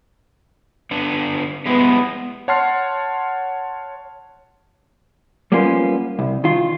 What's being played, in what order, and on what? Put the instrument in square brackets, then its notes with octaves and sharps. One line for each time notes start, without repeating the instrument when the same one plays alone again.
[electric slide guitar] D3 B3 D4
[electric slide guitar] G3 G#3 E4 [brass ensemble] B3
[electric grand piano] C#5 F#5 A5 C6 F6 C7
[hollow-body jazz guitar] G3 A#3 B3 C#4 F4 C5
C2
D#3 F4